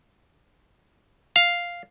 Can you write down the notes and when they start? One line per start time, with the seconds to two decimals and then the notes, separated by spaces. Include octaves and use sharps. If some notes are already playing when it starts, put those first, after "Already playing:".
1.36 F5